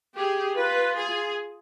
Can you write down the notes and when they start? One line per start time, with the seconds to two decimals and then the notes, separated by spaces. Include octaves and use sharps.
0.15 G4 G#4
0.56 F4 B4
0.96 G#4